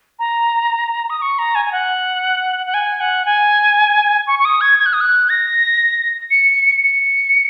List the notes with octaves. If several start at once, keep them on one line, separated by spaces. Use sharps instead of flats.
A#5
D#6
C#6
A#5
G#5
G#5
F#5
F#5
G#5
F#5
G#5
C#6
C#6
D#6
G#6
G#6
F#6
D#6
F#6
A#6
C#7
C#7